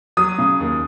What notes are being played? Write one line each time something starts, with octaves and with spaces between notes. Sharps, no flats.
F#3 D#6
C#3
D#2